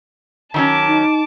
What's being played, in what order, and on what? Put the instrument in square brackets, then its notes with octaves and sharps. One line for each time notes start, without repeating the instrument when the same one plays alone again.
[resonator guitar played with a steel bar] D#3 F#3 C#4 [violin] A5 D6
[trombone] D#4